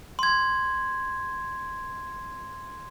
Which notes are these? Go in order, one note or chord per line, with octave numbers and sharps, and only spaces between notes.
C6 G#6